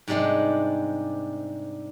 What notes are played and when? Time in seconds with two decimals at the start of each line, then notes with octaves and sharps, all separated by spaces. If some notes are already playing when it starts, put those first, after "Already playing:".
0.08 G#2 C3 G3 G#3 D4